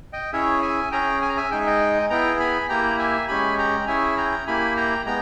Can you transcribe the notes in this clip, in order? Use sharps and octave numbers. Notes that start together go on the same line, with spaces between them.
D#5 G5
C#4 E4 G#4 C#5 E5
E5 G#5
C#4 G#4 G5 A#5
G#5
A#5
E5 G#5
G#3 D#4 G#4 G5
E5
D#5 G5
B3 E4 G#4 G5 A#5
G#5 B5
A#3 E4 G4 G5 A#5
E5 G#5
G#3 C#4 G4 G#5 B5
G5 A#5
C#4 E4 G#4 E5 G#5
G5 A#5
A#3 E4 G4 G#5 B5
G5 A#5
G#3 B3 G5 A#5